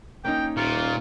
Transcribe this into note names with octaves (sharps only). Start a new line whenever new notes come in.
A#3 C#4 D#4 G5
D#1 A#2 F4 C#6